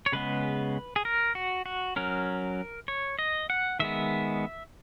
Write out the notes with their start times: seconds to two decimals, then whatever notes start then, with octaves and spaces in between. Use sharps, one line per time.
0.06 C#5
0.12 C#3 G#3 B3 B4
0.96 G#4
1.05 A#4
1.35 F#4
1.66 F#4
1.96 F#3 C#4 A#4
2.88 C#5
3.19 D#5
3.50 F#5
3.79 D#3 G#3 B3 E5